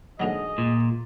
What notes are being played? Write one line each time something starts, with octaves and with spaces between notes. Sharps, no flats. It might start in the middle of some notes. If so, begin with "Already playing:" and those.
G#2 D3 F#3 G#4 A#4 D#5
A#2